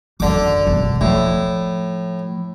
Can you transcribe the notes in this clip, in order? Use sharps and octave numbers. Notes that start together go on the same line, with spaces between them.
F#2 D3 D#3 D6
E1 D#3
A2 F3